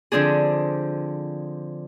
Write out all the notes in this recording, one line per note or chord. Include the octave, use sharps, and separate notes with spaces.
D3 F3 C4 D4 G#4